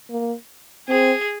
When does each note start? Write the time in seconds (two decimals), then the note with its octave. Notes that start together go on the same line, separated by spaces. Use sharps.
0.10 A#3
0.89 C4 G#4